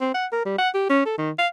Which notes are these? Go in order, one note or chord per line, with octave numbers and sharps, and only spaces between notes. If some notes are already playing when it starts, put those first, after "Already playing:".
C4
F#5
A#4
G3
F#5
G4
C#4
A4
D#3
F5